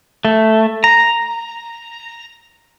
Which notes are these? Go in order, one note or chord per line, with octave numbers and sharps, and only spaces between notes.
A3
A#5